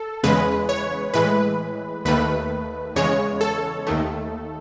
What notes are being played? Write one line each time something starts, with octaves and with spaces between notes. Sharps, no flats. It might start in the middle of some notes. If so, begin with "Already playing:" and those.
Already playing: A4
E2 C#3 G#3 B4
C#5
A2 E3 G#3 B4
D#2 D#3 A3 B4
E2 C#3 G#3 C#5
A4
D#2 D#3 A3